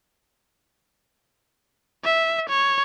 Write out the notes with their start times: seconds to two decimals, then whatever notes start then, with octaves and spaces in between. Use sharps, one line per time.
2.04 E5
2.49 C#5